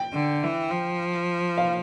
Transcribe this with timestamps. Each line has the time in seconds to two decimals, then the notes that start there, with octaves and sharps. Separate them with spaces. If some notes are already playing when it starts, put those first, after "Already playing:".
Already playing: G5
0.13 D3
0.43 E3
0.71 F3
1.58 F5